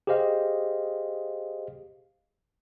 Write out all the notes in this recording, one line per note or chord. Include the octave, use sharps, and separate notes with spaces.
G4 G#4 C5 D#5 F5